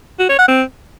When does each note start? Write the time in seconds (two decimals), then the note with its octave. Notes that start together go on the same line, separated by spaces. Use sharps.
0.19 F#4
0.29 C#5
0.39 F#5
0.48 C4